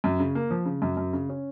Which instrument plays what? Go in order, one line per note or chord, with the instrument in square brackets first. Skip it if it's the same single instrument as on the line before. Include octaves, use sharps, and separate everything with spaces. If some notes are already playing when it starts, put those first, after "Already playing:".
[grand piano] F#2
C#3
A#3
F3
C#3
F#2
F#2
C#3
C#4